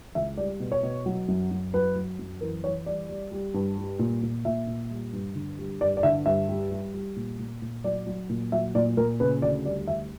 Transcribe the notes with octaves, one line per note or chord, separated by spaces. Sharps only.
C#2 E5
G3 D5
B2
C#5
B2
F#3
F#2
F#2
F#3 B4
F#3
F#2
E3 A#4
E3 C#5
G3 D5
G3
G3
G2
G3
A#2
A#2
A#2 E5
A#2
G3
G2
D3
G3
G2 D5
D5
D3 E5
G2 E5
G3
G3
G3
A#2
A#2
A#2
F#3 D5
F#3
A#2
F#3 E5
A#2 D5
A#2 A#4
C#3 B4
D2 D5
G3 D5
D2 E5